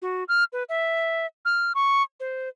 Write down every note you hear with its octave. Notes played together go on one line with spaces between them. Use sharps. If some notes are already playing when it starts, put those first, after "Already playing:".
F#4
F6
B4
E5
F6
C#6
C5